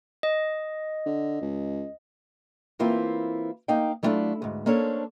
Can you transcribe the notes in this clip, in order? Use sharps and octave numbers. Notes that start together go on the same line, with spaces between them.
D#5
D3
C#2
E3 A#3 C4 E4 F4
A#3 D#4 F5 G5
F#3 G3 A3 D4 E4 F4
D2 G#2
A#3 C#4 D4 A4 C5 C#5